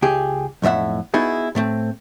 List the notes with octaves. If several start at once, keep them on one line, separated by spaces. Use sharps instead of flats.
C#2 G4 G#4
B1 F2 A2 E5 F#5
B3 D#4 E4 F#4 G#4
A2 A3 C4